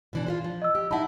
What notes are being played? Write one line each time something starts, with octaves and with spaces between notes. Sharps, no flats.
B2 E3 D4
F4 G4 C5
F3
D#5 E6
G4
D#4 E4 F#5 A5 B5